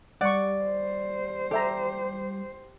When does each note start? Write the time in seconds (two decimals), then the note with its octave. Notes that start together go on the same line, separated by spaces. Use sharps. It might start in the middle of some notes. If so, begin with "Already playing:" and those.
0.21 G3 D5 F#5 C#6
0.64 C5
1.51 G3 G4 A4 E5 A#5